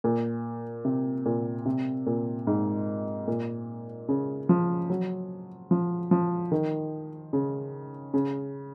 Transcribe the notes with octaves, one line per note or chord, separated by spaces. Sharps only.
A#2
C3
A#2
C3
A#2
G#2
A#2
C#3
F3
F#3
F3
F3
D#3
C#3
C#3